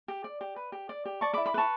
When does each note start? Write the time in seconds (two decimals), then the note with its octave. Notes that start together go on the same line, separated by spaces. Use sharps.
0.08 G4
0.24 D5
0.41 G4
0.56 B4
0.72 G4
0.89 D5
1.05 G4
1.21 D5 A5 C#6
1.34 B5 D6
1.37 E4
1.46 B5 D6
1.54 B4 A5 C#6